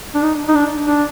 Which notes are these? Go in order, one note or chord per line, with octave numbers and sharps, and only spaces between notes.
D4
D#4
D#4
D4
D4